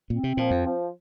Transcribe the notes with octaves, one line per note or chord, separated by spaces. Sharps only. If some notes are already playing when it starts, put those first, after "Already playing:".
A#2 C4
C3
A#2 F3
F2
F3